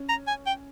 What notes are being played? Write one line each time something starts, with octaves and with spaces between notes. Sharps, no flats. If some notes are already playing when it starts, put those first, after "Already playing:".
Already playing: C#4
A#5
G#5
G5